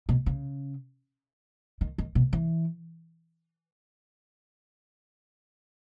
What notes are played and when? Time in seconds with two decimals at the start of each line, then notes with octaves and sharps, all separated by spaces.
0.09 B2
0.26 C#3
1.81 D#3
1.98 D#3
2.15 B2
2.33 E3